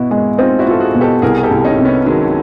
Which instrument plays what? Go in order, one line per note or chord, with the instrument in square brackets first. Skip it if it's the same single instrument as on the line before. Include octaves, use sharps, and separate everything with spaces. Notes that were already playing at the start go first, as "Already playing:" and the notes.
Already playing: [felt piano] B2 [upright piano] E4 F#4
[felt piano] G#3
[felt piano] C4 [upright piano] D#4 F4
[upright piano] E4 F#4
[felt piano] F4 [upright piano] A4
[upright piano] F#4 G#4
[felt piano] B2
[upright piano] G4 A4
[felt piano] C2 [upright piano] G#4 A#4
[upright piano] G#4
G4 A4
[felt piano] C2
[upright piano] C#4 D#4
[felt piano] C3
[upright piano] B3 C#4
[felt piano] D#3 [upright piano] F#3 G#3